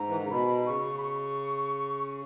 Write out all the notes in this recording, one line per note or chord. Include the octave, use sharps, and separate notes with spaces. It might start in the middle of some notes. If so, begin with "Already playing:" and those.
Already playing: G#2 A#5
E3
D#3
C#3
B2 B5
C#3 C#6
B5
C#6